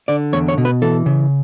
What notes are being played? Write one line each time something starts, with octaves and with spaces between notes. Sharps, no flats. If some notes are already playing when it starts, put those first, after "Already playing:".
D3 D5
E2 C#5
C#5
B2
B4
E3 A4
C#3